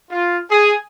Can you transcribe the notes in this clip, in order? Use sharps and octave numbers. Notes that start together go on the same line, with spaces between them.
F4
G#4